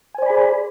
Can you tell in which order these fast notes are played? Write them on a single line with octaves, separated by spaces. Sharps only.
G#5 C5 D5 B5 G#4